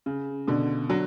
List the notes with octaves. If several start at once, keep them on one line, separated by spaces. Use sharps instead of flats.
C#3
B2 D3
D3 F#3